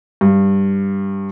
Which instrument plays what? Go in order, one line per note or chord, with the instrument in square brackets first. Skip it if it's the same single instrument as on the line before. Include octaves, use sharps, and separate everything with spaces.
[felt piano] G2